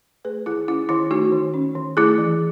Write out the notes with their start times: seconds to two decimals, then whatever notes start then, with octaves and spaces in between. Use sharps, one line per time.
0.25 A3 G#4 B4
0.46 D#3 E4 G#4
0.68 C#4 E4
0.89 D#3 E4
1.11 A3 D#4 F#4
1.32 D#3
1.54 C#4
1.75 D#3
1.97 A3 E4 G#4
2.18 E3